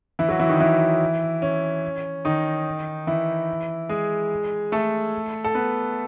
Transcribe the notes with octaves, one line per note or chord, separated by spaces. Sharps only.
E3 E4
F#3 F#4
E3 E4
D#3 D#4
E3 E4
C#4
D#3 D#4
E3 E4
G#3 G#4
A3 A4
A4
B3 B4